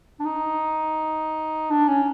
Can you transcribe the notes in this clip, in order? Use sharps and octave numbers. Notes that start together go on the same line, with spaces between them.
D4
D#4
D4
C#4